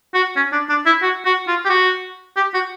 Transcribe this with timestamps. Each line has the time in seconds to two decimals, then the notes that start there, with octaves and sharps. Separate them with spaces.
0.14 F#4
0.36 C#4
0.52 D4
0.69 D4
0.86 E4
1.02 F#4
1.25 F#4
1.48 F4
1.65 G4
1.69 F#4
2.36 G4
2.54 F#4